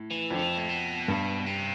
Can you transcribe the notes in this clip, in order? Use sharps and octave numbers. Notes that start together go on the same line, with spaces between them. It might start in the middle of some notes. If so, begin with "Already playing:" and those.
Already playing: A2
E3
F2 D3
E3
A2
B2
G2
C3